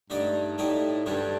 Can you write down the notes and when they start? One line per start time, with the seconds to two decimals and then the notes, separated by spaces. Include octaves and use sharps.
0.10 G2 D3 A3 D#4 G4 D5
0.58 A2 D3 A3 D#4 G4 D5
1.06 D2 G2 D3 G3 D4 G4